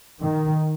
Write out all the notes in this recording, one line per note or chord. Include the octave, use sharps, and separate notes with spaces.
D#3